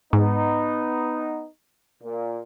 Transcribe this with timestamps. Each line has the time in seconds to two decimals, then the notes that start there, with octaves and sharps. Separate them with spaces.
0.13 G#2 B3 D#4
2.02 A#2